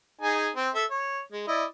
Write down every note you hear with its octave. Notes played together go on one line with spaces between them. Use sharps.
D#4 G#4 G#5
C4
A4 E5
C#5
G#3
E4 D5 D#5